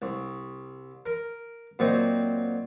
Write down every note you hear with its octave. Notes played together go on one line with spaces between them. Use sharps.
C2
A#4
A#2 F#3 C4 D#4